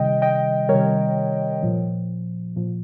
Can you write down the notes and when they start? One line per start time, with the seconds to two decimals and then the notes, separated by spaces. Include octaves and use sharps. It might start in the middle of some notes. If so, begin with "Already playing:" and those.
Already playing: C3 D#3 G3 D#5 G5
0.22 D#5 G5
0.69 C3 D#3 G3 A#4 C#5
1.63 A#2 F3
2.56 A#2 F3